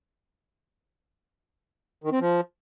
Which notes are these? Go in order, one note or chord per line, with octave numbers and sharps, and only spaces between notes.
D#3
C4
F3